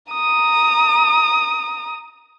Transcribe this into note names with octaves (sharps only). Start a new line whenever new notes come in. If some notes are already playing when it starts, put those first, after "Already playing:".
A#5 D#6